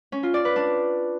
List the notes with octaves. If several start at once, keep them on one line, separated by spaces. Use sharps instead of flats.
C#4
F4
D5
B4
D4